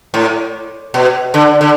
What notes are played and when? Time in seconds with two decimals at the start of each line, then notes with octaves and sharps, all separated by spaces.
0.14 A2
0.94 B2
1.34 D3
1.61 D3